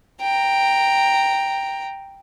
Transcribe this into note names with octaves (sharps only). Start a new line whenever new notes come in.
G5 A#5